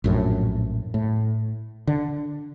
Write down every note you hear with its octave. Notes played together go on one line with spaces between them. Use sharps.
A#1 F#2 A2
A2
D3